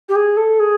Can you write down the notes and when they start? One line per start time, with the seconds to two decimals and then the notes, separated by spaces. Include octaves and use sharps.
0.09 G4
0.15 G#4
0.37 A4
0.59 G#4